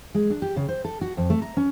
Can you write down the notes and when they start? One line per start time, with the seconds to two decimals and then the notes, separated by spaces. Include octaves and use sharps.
0.15 G#3
0.30 D4
0.42 G4
0.56 C#3
0.69 C5
0.85 A4
1.01 F#4
1.17 F2
1.30 A3
1.42 A#5
1.57 C#4